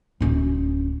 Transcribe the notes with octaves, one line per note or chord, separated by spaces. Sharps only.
D1 C#4